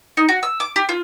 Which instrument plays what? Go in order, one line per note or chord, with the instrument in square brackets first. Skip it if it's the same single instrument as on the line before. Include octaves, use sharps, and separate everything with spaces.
[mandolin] D#4
F#4
E6
D6
G4
F4